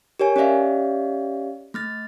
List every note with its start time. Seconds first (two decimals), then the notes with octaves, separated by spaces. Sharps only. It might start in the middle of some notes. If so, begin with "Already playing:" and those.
0.20 G4 A#4 C#5 G#5
0.36 C#4 G4 C#5 D5 E5 F5
1.74 A3 F6 A6